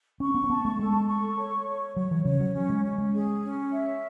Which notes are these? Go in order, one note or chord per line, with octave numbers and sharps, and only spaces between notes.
C#4 C#6
B3
C#4
B3 A5
A3
G#3 A4
C#6
C#5
C#5
F#3 C#5
E3
C#3 C#5
F#3
C#4
G#3
C#4
G#3
G#4
C#4
E5